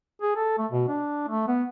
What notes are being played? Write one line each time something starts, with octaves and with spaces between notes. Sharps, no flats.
G#4
A4
A3
B2
D4
A3
B3